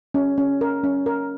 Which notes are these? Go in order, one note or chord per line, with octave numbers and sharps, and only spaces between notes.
C#4
C#4
A#4
C#4
A#4